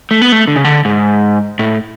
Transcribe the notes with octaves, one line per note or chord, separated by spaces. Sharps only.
A3
B3
A3
D3
C#3
D3
G#2
A2